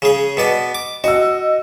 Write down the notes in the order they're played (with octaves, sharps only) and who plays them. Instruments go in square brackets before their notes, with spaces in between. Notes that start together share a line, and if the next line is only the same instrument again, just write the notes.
[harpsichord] C#3 G#4
B2 B3 D5
D6
[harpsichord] F#4 [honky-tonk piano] D#5 E6